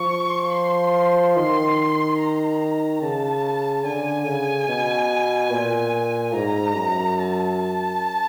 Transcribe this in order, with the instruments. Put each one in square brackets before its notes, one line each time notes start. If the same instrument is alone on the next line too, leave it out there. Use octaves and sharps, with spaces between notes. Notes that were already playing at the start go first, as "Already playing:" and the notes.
Already playing: [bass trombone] F3 [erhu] C#6
[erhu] C6
[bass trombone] D#3 [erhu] C6
[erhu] A#5
[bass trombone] C#3 [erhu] A5
[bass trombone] D3 [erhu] G#5
[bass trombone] C#3
B2
A#2
[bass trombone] G#2 [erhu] A#5
[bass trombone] F#2
[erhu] A5